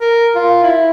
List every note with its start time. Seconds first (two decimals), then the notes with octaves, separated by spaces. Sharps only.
0.01 A#4
0.35 F4
0.63 E4